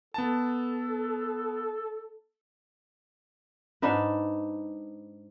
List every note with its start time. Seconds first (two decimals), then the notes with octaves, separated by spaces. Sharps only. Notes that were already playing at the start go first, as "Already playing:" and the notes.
0.14 B3 A4 A5
3.82 G#2 D4 D#4 B4